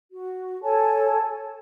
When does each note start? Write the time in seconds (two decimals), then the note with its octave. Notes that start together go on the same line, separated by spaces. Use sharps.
0.12 F#4
0.63 A4 C#5 G#5 A5